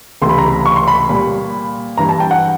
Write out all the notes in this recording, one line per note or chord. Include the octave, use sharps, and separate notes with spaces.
C#2 C3 E3 A3 C6
B5
A#5
B5
C#6
C6
B5
A#2 G3 B5
G2 E3 G3 A#5
A5
G5
F#5